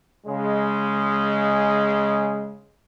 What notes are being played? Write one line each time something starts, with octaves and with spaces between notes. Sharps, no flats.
C#3 G#3